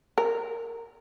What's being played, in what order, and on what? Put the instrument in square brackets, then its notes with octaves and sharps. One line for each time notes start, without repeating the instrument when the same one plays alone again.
[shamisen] A#4